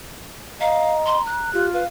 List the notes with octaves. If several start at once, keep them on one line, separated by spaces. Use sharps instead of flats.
D#5 F5 A#5
C6
F#6
F4 G4
B4 F5